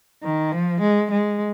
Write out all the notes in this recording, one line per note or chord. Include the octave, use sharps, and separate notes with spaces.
D#3
F3
G#3
G#3